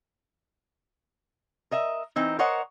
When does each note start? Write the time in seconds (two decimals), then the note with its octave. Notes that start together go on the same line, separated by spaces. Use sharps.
1.71 A#4 D#5 E5
2.16 E3 C4 D#4
2.39 A#4 C5 C#5 D#5 F#5